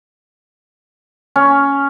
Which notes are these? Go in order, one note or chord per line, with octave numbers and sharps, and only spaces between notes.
C#4